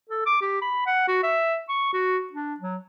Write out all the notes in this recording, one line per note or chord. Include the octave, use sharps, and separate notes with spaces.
A4
D6
G4
B5
F#5
F#4
E5
C#6
F#4
D4
F#3